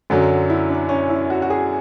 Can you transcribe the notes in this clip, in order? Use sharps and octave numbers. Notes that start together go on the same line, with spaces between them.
F#2 D3 F#3
E4
D4
C#4
E4
F#4
F#4
G#4